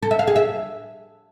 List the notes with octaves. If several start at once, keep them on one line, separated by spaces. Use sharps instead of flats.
A4
E5
F5
G#4
E5